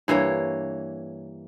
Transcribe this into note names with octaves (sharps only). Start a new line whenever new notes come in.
G2 E3 A#3 C#5